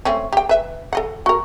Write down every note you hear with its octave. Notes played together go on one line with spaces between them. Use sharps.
A3 C4 C#4
G4 G5
B4 E5
A4 D#5 F#5
F#4 A#4